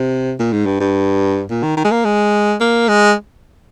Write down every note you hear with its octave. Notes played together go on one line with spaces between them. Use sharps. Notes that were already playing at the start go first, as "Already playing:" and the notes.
Already playing: C3
A#2
G#2
G2
G2
A#2
D#3
D#3
G#3
A#3
G#3
A#3
G#3